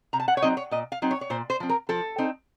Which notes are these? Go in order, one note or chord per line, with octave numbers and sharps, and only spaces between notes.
C3 A#5
A5
F#5
C#5
F#3 C4 D#4 D#5
C#5
A#2 D#5
F5
F#3 C4 D#4
C#5
C#5
A#2 C5
C5
F3 C4
A#4
F3 A4
C4 D#4